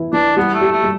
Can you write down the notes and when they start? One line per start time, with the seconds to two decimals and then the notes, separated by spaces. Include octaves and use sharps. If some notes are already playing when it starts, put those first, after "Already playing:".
Already playing: E3 E4
0.13 E3 D4
0.36 G3 B3
0.54 A3
0.61 G4
0.72 A3
0.83 G3